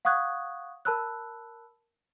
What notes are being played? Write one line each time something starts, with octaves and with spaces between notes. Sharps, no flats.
F5 F#5 C#6 D#6 F#6 G#6
A#4 A5 B5 E6 F#6